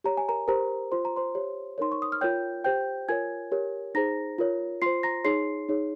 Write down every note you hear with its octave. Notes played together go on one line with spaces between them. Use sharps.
G4 C#5 A#5
G#5
A#4 A#5
G4 A#4 C5 A#5
F4 C5 C6
A#5
C5 C6
G4 C#5
D#4 A#4 C#5 C6
C#6
D#6
F6
F4 A#4 C#5 G5 G6
G4 C5 G5 G6
F4 A#4 C#5 G#5 G#6
G4 A#4 C#5
D#4 G#4 C5 A#5 A#6
F4 A#4 C#5
F4 C5 C6 C7
A#5 A#6
D#4 G#4 C#5 C6 C7
D#4 G#4 C#5